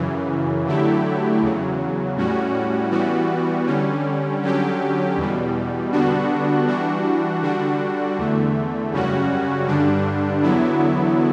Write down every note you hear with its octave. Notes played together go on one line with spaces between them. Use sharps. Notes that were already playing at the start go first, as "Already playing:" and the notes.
Already playing: F#2 C#3 E3
D3 F#3 A3 E4 G4
E2 C#3 F#3
A2 G3 C#4 F#4
E3 G3 B3 F#4
D3 G3 C#4
D3 F#3 C#4 G4
E2 B2 G3
D3 G3 B3 D4 F#4
E3 G3 D4 F#4
D3 G3 D4 F#4
E2 D3 A3
F#2 C#3 G3 C#4 F#4
G2 D3 G3 D4
E2 D3 F#3 B3 E4